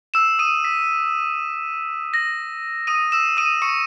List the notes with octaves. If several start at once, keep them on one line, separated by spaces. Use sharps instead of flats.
E6 E7
D#6 D#7
B6
A#6
D#6 D#7
E6 E7
D#6 D#7
C#6 C#7